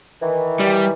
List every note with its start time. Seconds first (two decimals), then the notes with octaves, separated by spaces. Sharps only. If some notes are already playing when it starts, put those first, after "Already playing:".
0.21 D#3 E3
0.60 G3